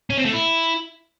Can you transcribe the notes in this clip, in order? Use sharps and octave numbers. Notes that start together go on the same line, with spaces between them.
C#4
C4
A3
E4